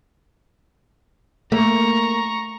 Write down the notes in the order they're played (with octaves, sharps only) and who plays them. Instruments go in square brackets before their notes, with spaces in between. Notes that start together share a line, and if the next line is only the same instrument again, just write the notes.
[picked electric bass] A3 [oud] A#3 [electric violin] A#5 C#6